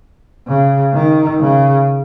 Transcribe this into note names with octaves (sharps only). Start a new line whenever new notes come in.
C#3
D#3
C#3